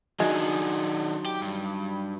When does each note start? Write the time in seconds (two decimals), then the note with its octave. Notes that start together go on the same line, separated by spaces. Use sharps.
0.20 D#3 F#3 D4 D#4 G#4
1.26 G4
1.42 G2